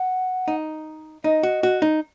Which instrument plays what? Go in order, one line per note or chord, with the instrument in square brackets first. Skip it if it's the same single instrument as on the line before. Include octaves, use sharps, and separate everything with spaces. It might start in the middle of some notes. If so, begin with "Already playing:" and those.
Already playing: [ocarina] F#5
[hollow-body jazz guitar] D#4
[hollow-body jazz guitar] D#4 [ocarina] D#5
[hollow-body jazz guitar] F#4
F#4
D#4